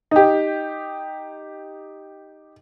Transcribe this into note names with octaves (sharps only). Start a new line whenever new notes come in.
D#4 G4